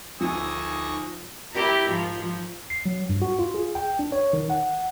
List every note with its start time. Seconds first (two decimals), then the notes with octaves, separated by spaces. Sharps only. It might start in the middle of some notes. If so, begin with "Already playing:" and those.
0.21 D2 F3 D#4 G#5 C#6 D#6 E6 A#6
1.53 E4 G4 A#4
1.90 G#2 F3
2.70 C7
2.86 F#3
3.09 G2
3.22 F#4
3.39 F4
3.54 G#4
3.75 G5
3.99 D4
4.12 C#5
4.33 D#3
4.50 F#5